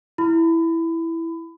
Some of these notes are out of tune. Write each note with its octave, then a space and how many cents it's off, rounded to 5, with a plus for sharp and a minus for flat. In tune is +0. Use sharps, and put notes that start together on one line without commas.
E4 +0 B5 +25